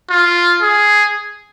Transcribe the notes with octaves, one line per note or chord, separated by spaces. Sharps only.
F4
G#4